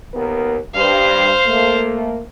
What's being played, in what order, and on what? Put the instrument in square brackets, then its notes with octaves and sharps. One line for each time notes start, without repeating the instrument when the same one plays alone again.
[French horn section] D#2 B3 A#4
[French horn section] G2 [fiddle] C5 F5
[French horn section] A3 A#3